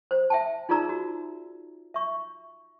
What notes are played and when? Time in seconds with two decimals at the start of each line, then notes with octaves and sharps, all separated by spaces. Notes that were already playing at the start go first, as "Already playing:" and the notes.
0.11 C5
0.30 E5 G5 A5
0.69 D#4 F4 G#4 D5 A#5 E6
0.89 F#4
1.94 E5 C#6